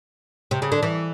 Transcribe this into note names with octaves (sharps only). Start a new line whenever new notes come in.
C3
C#3
D3
E3